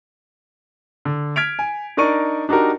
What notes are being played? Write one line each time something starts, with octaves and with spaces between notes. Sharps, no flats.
D3
F6 G#6 B6 D7 F7
G#5
D4 D#4 A#4 D5 C#6 D#7
D4 D#4 F#4 G4 A#4